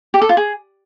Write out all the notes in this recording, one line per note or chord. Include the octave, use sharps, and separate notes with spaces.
G4
A4
F4
G#4